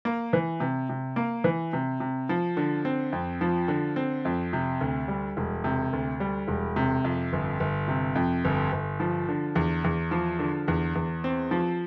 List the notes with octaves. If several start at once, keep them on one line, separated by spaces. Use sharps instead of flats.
A#3
E3
C3
C3
A#3
E3
C3
C3
F3
D3
C4
F2
F3
D3
C4
F2
C3
D2
G3
E1
C3
D2
G3
E1
C3
F2
G1
G1
C3
F2
G1
G1
F3
D3
E2
E2
F3
D3
E2
E2
C4
F3